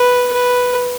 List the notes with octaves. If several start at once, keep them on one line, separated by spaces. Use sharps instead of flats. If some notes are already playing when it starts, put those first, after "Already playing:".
Already playing: B4
B4